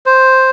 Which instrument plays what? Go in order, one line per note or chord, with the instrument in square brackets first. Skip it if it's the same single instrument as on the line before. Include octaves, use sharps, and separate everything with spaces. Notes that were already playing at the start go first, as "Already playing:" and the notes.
[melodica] C5